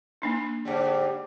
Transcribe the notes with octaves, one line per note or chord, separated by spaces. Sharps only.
A#3 D4 D#4
G#2 D3 G3